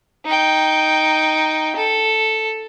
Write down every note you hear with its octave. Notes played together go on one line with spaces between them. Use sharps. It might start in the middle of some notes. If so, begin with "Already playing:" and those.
D#4 G5
A4